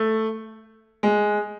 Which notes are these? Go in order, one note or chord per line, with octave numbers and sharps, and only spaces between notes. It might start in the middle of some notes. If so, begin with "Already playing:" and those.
Already playing: A3
G#3